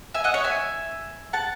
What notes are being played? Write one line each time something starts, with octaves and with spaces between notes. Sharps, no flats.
E5 G#5
D#5 F#5
C#5 E5
E5 G#5
F#5 A5